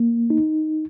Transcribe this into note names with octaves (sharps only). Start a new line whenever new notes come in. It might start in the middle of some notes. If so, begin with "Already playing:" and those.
Already playing: A#3
D#4